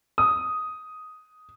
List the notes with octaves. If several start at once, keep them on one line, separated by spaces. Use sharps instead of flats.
D#6